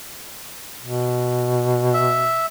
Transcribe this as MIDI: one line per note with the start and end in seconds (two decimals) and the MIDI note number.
0.82 2.45 47
1.94 2.46 76